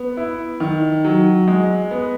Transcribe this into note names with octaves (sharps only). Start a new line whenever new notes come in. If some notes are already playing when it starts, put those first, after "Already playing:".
Already playing: B3
E4
D#3
F#3
G#3
B3